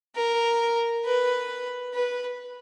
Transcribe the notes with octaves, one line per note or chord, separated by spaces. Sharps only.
A#4
B4
B4